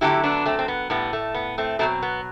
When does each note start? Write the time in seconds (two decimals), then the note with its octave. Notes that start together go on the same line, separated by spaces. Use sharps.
0.01 D3 F#3 A3 E4 G4
0.23 B3 D4
0.46 A3 C4
0.59 C4
0.68 B3
0.90 A2 G3 B3
1.13 A3
1.34 B3
1.58 A3 C4
1.79 B2 F#3 A3 C4
2.02 B3